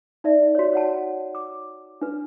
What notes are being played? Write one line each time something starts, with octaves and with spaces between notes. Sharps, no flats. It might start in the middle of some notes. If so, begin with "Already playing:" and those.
D#4 D5 E5
F#4 C#5
C#5 F#5 A5
D6
D4 B4